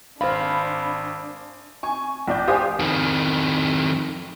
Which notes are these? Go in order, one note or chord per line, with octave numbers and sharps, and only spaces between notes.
G#1 D4 C5 F5 B5
G#5 C#6
A#1 D5 G6
G4 C5 F5 G#5 D#6
F2 D#3